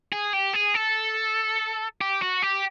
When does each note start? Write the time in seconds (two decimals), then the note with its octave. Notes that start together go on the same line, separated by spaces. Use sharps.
0.12 G#4
0.33 G4
0.54 G#4
0.75 A4
2.01 G4
2.22 F#4
2.42 G4